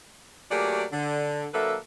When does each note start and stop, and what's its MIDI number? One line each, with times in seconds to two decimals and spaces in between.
0.51 0.84 54
0.51 0.84 57
0.51 0.84 58
0.51 0.84 67
0.51 0.84 68
0.51 0.84 74
0.92 1.46 50
1.54 1.75 50
1.54 1.75 54
1.54 1.75 58
1.54 1.75 69
1.54 1.75 71
1.54 1.75 76